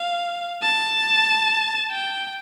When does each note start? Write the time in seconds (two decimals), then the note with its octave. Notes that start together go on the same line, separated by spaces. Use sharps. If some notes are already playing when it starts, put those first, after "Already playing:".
Already playing: F5
0.63 A5
1.91 G5